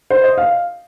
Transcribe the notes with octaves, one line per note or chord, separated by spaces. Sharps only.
C5
D#5
F5